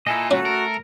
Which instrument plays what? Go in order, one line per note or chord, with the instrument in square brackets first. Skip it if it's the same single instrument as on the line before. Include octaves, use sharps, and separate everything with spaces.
[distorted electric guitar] A#2 [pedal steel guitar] E4 A4 D#5 [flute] G#5
[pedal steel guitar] A3 A4 [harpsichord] C#4 [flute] F#4
[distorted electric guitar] A#4